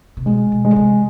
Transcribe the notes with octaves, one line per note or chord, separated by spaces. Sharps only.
C3
B2 G#3
B2
G#3
D3
C3